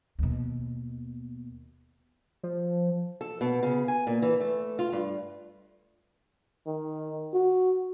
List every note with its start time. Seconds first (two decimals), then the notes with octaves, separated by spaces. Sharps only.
0.19 D#2 B2
2.43 F3
3.21 A4
3.41 B2
3.63 C#3
3.88 G#5
4.07 A#2
4.22 E3
4.40 A3
4.79 F4
4.93 G2
6.66 D#3
7.34 F#4